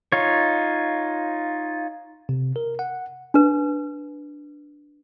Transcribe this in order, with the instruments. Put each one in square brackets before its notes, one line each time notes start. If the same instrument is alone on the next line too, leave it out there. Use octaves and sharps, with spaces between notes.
[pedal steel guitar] D#4 F4 C#5
[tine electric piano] C3
A#4
F#5
[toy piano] D4 B4